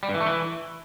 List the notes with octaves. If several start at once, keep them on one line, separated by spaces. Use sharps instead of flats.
G3
G2
E3
A3
E3